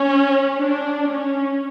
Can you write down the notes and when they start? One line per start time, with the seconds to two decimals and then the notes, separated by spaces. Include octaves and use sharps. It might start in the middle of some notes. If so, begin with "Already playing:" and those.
Already playing: C#4
0.59 D4
1.10 C#4